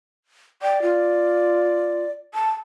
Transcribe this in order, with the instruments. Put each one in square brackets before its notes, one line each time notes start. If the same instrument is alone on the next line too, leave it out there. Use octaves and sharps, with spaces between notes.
[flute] D5 [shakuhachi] G5
[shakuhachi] F4
A5